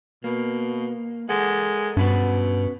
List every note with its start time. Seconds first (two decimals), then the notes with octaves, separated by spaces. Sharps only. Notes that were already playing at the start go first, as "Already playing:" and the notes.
0.24 B2 A#3
1.29 G#3 A4 A#4 F#5
1.97 G2 B2 C#4 B4 F#5